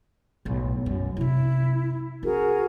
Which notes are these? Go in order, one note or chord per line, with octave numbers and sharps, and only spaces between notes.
B1 A2
F#2
C3 D4 E4
C#4 F#4 G#4 A#4